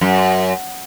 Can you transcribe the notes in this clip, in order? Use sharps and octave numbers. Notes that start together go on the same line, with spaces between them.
F#2